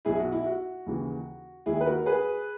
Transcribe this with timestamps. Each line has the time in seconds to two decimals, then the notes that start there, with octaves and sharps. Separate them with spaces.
0.05 B1 B2 E4 G#4
0.19 F#4
0.32 E4
0.46 F#4
0.86 D#2 C#3 E3
1.66 D#2 D#3 E4 G#4
1.81 B4
1.86 F#4 A#4
2.06 G#4 B4